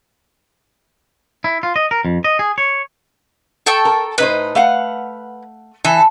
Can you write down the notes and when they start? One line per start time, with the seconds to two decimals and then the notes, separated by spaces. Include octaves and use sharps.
1.44 E4
1.63 F4
1.76 D#5
1.91 A#4
2.05 F2
2.24 D#5
2.39 G#4
2.58 C#5
3.66 A4 G5 C#6
3.85 A#4
4.18 A2 D#4 B4 C5
4.55 A3 F5 F#5
5.84 E3 A4